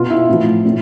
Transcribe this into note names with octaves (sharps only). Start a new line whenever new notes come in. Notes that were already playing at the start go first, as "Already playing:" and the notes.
Already playing: B2 F4
E4
A2 F3
A2